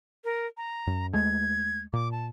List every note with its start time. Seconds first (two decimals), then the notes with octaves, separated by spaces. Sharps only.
0.24 A#4
0.57 A#5
0.87 F#2
1.13 D#2 G#3 A3 G#6
1.93 A#2 D6
2.12 A5